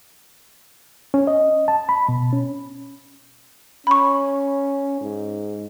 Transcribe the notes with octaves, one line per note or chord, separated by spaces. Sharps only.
C#4
D#5
A5
B5
B2
C#4
C#4 B5 C#6
G#2